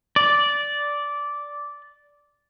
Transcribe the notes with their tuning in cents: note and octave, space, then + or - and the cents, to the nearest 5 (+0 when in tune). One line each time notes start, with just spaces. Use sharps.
D5 -10